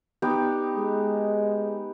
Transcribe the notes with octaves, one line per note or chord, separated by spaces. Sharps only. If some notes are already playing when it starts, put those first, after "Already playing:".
B3 D#4 G4
G#3